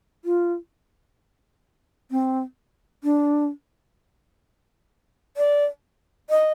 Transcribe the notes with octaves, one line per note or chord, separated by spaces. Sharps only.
F4
C4
D4
D5
D#5